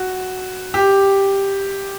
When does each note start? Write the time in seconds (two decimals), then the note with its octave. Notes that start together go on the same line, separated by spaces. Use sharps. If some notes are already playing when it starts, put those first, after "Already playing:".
Already playing: F#4
0.74 G4